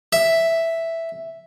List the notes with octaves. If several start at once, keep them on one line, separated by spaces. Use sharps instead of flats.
E5